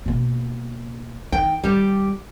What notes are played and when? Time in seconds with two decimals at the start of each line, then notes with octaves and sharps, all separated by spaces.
0.06 B2 A#3
1.32 D#3 G5
1.64 D#3 G3 G4